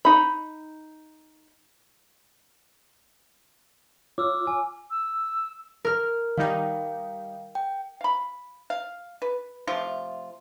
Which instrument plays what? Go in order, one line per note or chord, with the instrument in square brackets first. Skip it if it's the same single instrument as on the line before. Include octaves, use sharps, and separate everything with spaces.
[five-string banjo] D#4 B5
[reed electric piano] F4 C#5 [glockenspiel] D6 E6 F6
[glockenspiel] G#5
[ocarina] E6
[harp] A#4 F6
[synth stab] D#3 G3 D#4 [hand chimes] F5 G5
[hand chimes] G5
[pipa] F5 B5
F5
B4
C3 F3 A3 F4